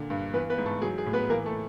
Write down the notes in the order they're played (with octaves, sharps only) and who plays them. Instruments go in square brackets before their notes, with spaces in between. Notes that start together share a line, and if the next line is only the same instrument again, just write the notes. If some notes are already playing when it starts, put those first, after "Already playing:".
Already playing: [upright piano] A#2 D3
G2
E3 B3 B4
B3 B4
G#2
A3 A4
F#3 G#4
G#4
A2
B3 B4
E3 A#3 A#4
A3 A4